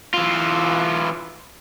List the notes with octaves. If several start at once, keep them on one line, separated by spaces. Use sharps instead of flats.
E3 F4